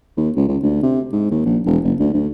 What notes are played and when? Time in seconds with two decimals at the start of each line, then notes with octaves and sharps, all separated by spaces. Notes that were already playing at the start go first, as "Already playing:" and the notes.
0.17 D#2
0.36 C#2
0.49 C#2
0.63 D2
0.83 C3
1.12 G#2
1.31 D#2
1.45 A#1
1.66 E1
1.84 F#1
1.99 D2
2.14 D2